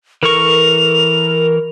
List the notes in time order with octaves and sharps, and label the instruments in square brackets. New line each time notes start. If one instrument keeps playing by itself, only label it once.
[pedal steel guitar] E3 A4 C#6 [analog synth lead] A#4 [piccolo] F7